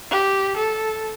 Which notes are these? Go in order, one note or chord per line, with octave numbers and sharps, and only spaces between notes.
G4
A4